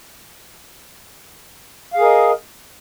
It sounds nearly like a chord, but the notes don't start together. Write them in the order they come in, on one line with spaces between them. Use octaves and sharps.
F5 G#4 A#4 D#5